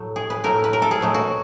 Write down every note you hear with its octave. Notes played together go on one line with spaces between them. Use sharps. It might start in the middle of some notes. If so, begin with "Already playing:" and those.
Already playing: A2 F#3 A3
G#4
B4
A2 F#3 A3 A#4
B4
A#4
A4
G#4
B2 F#3 A3
F#4